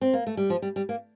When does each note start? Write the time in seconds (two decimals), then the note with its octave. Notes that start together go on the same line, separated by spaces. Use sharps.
0.01 C4
0.13 A#3
0.27 A3
0.37 G3
0.50 F3
0.62 G3
0.76 G3
0.89 A#3